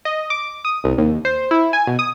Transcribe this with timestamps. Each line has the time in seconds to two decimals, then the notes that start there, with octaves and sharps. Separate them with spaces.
0.05 D#5
0.30 D6
0.65 D#6
0.84 C2
0.98 D#2
1.25 C5
1.51 E4
1.73 G#5
1.87 B2
1.99 D#6